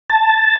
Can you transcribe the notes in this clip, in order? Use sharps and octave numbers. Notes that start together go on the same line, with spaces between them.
A5